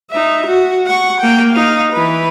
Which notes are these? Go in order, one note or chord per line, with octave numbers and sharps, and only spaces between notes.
D#4 E5
F#4
F#5 C#6
A#3 G5
D#4 F5
E3 B4